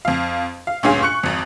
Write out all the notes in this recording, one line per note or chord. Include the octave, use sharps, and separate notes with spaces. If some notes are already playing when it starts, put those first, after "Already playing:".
F2 F5
F5
D2 G2 A#2 C#4 G#4 F5
C#6 F#6 C#7
G#1 F2